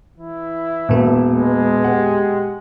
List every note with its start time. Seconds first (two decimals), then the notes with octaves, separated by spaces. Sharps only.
0.18 E3 E4
0.89 E1 A#2 A#3
1.33 G#3 B4
1.84 G4 F#5